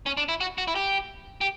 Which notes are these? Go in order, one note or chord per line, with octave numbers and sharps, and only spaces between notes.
C#4
D4
E4
F#4
F#4
E4
G4
G4